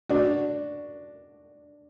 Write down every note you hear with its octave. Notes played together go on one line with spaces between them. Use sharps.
D4 F#4